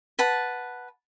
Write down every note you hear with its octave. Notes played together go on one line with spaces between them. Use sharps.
B4 F#5 A5